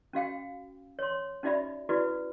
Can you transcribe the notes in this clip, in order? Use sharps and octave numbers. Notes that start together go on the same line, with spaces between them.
C#4 F#4 F5 G5
C#5 C6
C#4 D#4 F#4 D5 E5 B5
E4 F#4 B4 D5